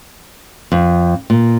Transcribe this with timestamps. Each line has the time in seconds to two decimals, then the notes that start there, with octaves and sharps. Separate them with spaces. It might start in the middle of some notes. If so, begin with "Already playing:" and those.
0.72 F2
1.30 A#2